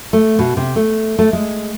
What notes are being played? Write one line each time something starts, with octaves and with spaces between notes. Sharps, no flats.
A3
B2
C3
A3
A3
G#3